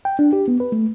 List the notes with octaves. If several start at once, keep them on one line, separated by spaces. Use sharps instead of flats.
G5
D4
G4
B3
B4
A3